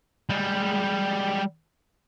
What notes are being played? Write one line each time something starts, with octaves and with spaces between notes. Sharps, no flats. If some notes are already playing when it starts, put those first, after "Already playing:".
G3 G#3